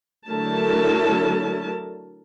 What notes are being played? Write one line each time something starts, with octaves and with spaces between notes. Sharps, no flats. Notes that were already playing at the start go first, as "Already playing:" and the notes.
D3 F#3 A3 E4 A#4 A5